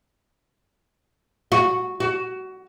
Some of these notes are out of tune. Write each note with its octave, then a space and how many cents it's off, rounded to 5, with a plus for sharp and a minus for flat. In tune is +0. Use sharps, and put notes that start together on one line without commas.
F#4 -5
F#4 +20